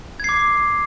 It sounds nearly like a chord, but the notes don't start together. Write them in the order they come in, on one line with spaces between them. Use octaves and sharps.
G#6 C7 D6